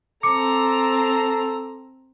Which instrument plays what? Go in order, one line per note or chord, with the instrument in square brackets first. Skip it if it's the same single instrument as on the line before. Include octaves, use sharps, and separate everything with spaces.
[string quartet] C4 A#5 [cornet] A4 [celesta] D6 C#7